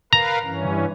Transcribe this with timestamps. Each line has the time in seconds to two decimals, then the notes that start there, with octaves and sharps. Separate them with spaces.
0.13 A#4 B4 F5 A#5
0.43 G2 E3 C#4